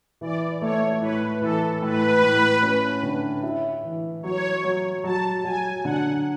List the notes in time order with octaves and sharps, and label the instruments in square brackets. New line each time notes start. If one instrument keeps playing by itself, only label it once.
[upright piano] E3 [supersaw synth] D5
[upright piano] A3 [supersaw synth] C#5
[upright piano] A2 [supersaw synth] B4
[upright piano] E3 [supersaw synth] A4
[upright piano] A2 [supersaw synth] B4
[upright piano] A2
C#4
D3
E4
E3
[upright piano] F#3 [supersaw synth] C#5
[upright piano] F#3
[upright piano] F#3 [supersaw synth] A5
[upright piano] F#3 [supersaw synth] G#5
[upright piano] D3 [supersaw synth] F#5